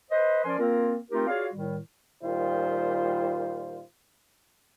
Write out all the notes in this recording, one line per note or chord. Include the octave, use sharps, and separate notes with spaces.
B4 C5 D#5
F3 C#4 A#4 D5 G#5 C6
A#3 C4 F4 A#4
A3 C4 D#4 F4 G4 A#4
F4 F#4 G#4 C#5 D5 F5
A2 D#3 G3
A#2 D#3 G3 F4 C5